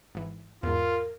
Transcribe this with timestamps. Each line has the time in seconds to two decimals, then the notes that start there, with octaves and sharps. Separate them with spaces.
0.15 G#1 E3
0.63 E2 G#2 F4 A#4